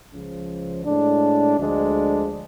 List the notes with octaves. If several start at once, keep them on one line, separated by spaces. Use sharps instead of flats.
C#2 C#3 F3
A2 G#3 D4
D2 D3 F3 G#3 D4